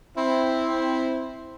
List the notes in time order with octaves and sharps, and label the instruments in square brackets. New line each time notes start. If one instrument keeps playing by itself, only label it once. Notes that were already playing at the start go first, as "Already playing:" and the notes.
[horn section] C4 E4